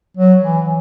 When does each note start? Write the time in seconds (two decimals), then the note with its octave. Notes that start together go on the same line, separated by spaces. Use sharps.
0.17 F#3
0.42 E3